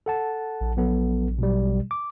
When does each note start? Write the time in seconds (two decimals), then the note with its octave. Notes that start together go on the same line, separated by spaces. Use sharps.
0.06 A4 F#5 A5
0.61 A#1
0.77 F#3 B3 A4
1.38 B2 F#3 G3
1.91 D6